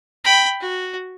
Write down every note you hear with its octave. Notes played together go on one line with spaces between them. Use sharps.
G5 B5
F#4